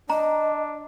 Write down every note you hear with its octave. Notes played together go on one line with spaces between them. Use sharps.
D4 D#5 A#5